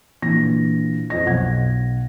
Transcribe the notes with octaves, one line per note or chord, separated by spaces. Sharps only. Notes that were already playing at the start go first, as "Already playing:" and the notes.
A#2 D3 E3 A#6
F2 D#5 A#6
B1 F#5 G#6